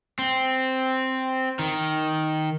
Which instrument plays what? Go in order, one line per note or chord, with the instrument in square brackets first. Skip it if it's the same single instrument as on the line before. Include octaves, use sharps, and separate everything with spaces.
[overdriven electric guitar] C4
D#3